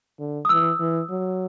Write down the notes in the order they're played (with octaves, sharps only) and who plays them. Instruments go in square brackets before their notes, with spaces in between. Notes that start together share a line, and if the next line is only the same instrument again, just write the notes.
[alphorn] D3
[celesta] D#6
[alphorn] E3 [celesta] E6
[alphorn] E3
F#3